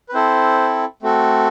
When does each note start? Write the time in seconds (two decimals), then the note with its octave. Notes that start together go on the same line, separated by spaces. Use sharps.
0.09 B4
0.13 C4 E4 A4 C5
1.03 A3 C4 F#4 A4